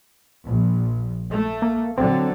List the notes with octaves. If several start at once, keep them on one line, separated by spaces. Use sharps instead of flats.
A#1
A3
A#3
D3 F#3 C4